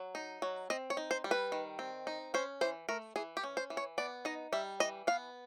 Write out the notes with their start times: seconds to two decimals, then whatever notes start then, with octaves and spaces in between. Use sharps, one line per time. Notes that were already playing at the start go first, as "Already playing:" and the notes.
Already playing: F#3
0.15 D#4
0.42 F#3
0.70 C4 D#5
0.90 C#5
0.97 D#4
1.11 C5
1.24 G3
1.31 B4
1.52 D#3
1.79 C4
2.07 D#4
2.34 C#4 C5
2.61 E3 C5
2.89 A3 A#4
3.16 E3 G#4
3.37 G4
3.43 C#4
3.57 C5
3.70 E3
3.77 C#5
3.98 B3 D5
4.25 D#4 D#5
4.53 G3 E5
4.80 E3 D#5
5.07 B3 F5